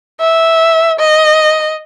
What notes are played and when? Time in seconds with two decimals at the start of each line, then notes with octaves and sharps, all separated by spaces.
0.21 E5
0.99 D#5